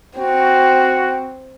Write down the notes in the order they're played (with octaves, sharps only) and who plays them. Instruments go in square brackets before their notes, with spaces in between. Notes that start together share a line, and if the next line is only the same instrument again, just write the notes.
[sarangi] C4 [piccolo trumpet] F#4